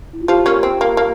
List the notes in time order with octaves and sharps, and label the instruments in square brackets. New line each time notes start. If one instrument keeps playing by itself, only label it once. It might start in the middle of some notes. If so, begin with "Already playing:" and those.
[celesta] E4
F4
[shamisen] F3 [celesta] G4
[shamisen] A#3 C#4
C4
A#3
A#3